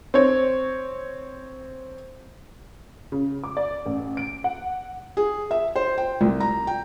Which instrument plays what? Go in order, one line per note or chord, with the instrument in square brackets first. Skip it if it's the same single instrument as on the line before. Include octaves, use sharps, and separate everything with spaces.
[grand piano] C4 C#5
[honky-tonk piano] C#3
D6
D5
A1
D7
F#5
[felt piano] G#4
E5
C5
G5
C2
A#5
G5